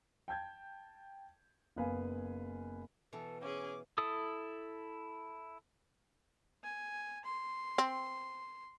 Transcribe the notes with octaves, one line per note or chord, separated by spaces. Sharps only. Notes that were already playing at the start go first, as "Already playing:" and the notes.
G5 A5 G6 G#6
F#1 B3 B4 F5 G#5
B2 E3 A4
C#4 G#4 D6
E4 A4 D#6
G#5
C6
C4